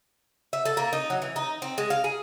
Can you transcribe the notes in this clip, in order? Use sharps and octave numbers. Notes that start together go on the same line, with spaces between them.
E5
A4
A#3
D#4
F#3
E3
D#4
C4
G#3
F5
G#4